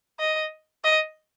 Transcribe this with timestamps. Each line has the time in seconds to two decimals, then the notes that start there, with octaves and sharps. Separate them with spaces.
0.19 D#5
0.84 D#5